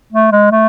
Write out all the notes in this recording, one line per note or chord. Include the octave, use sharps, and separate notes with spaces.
A3
G#3
A3